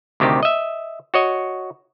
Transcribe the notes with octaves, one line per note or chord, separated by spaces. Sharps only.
D2 C3 D#3 G4
D#5 E5
F#4 C#5 D#5